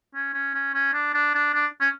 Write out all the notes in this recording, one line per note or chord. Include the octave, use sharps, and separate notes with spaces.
C#4
C#4
C#4
C#4
D4
D4
D4
D4
C#4